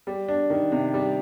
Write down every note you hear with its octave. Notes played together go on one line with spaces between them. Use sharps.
G3
D4
D#3
C3
G3